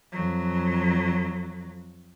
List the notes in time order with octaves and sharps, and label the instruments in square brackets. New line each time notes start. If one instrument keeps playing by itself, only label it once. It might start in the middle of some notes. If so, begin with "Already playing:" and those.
[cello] F2 F#3